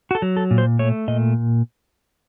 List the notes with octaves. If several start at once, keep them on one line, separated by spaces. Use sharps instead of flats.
F#4
A4
F#3
A4
A#2
C5
A3 C#5
A#2 D#5